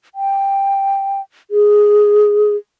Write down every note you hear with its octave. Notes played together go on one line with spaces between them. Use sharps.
G5
G#4